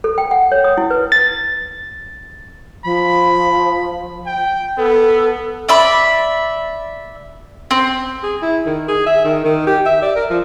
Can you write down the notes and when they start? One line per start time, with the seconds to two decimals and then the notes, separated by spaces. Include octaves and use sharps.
0.04 A4
0.18 G5
0.31 F#5
0.52 C#5
0.64 D#6
0.78 E4
0.91 B4
1.12 A6
2.84 F3 B5
4.26 G5
4.78 B3 A4
5.69 D5 E5 B5
7.71 C4
8.23 G#4
8.42 E4
8.66 D#3
8.88 G#4
9.06 E5
9.25 D#3
9.45 D#3
9.67 G4
9.86 E5
10.02 D5
10.16 A#4
10.30 F3